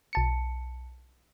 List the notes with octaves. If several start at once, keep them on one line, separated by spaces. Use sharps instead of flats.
B1 A5 C#7